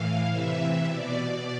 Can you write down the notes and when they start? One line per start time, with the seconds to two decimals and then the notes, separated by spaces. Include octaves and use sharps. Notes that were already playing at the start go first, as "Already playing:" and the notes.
Already playing: A2 E3 F5
0.29 C3 E3 E5
0.86 B2 D5